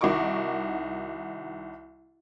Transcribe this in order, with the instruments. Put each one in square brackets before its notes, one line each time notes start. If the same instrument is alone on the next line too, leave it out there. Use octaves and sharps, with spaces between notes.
[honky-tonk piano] C2 D#3 F#4 D#5 C#6 D6